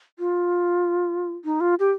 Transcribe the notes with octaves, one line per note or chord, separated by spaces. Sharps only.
F4
D#4
F4
G4